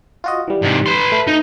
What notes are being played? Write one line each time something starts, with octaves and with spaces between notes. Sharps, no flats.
F4 F#4 D#5
E3 G3
G#2 C3
B4 C6
A3
D#4